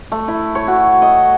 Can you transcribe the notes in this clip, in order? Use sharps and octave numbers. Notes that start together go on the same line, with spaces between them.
A3
E4
C#5
F#4
D#5